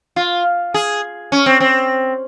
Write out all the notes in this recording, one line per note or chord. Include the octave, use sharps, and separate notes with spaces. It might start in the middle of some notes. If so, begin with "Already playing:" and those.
F4
G#4
C#4
C4
C4